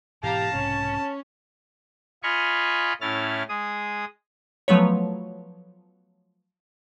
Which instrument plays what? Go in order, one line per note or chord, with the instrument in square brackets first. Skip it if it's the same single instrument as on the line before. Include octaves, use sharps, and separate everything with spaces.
[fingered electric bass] G#2 B2 E3 [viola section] G4 F5 A#5 [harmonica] A5
[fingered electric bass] B1 G#2 C3 [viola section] C#4
[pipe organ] F4 D#5 F5 G#5 B5 C#6
A2 C#4 E4 F6 A6
G#3 G#4 D#6
[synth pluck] F3 F#3 A3 B3 B4 C#5